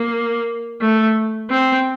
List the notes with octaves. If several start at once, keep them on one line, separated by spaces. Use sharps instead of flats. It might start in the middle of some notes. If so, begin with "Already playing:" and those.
Already playing: A#3
A3
C4